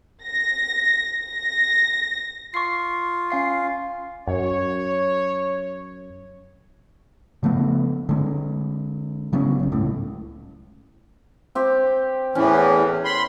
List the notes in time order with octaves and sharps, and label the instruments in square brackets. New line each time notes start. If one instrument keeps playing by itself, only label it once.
[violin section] A#6
A#6
[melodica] F4 [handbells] C#6 C7
[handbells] C#4 F5 C7
[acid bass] F#2 [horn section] C#5
[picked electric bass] C#3 F3 A3 B3
D3 G#3
C#3 F#3 B3 C#4
G1 C2
C#2 A2
[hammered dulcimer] C4 G4
[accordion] E2 A2 E3 [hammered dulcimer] C#4
[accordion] B5 C6